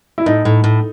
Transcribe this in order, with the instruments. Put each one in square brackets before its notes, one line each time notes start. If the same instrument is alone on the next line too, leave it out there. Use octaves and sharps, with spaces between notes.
[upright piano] E4
[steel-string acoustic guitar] A2 [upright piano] D#4
[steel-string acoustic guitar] A2
A2